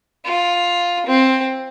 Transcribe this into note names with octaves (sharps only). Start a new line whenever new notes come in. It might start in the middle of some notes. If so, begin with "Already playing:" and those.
F4
C4